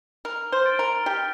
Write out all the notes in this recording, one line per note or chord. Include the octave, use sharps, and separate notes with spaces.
A#4 F6
C5
A6 D7 G7
A#4
G4 F6